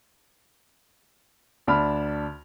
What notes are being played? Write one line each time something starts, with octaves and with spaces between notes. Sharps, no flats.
D2 D4 A5 B5 F6